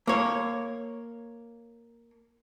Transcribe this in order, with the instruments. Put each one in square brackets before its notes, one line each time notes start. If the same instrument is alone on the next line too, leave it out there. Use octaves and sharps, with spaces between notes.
[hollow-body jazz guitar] A#3 C#5